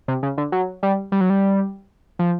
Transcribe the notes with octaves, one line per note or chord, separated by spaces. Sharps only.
C3
C#3
D3
F#3
G3
G3
F#3
G3
F3